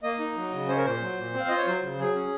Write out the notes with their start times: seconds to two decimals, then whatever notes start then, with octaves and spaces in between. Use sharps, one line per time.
0.03 A#3 D#5
0.19 D#4
0.36 F#3
0.52 C#3
0.68 C#4 C5
0.77 A#4
0.85 A#2 C5
1.01 F#3
1.17 A#2
1.34 C4
1.40 F5
1.49 F4 D#5
1.58 C#5
1.66 F#3 C5
1.82 C#3
1.99 F#3 G#4
2.15 C#4